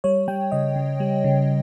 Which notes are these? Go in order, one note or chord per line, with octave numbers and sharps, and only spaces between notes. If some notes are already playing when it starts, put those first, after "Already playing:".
G3 C#5
G3 G5
C#3 D#5
C#3
G3
C#3